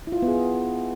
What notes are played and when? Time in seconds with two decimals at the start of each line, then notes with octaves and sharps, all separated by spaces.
0.07 E4
0.12 F4
0.17 E4
0.22 B3
0.28 G#4